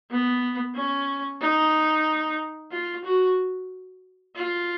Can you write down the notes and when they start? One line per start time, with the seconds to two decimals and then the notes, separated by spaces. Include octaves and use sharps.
0.11 B3
0.75 C#4
1.41 D#4
2.71 F4
3.05 F#4
4.35 F4